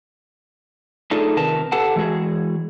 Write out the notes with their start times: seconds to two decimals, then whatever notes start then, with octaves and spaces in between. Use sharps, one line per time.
1.11 A3 D4 D#4 F4 G#4 A4
1.37 C3 D#3 A#4 B4 A5
1.72 G4 A4 B4 F#5 A5
1.96 E3 G#3 F#4 G#4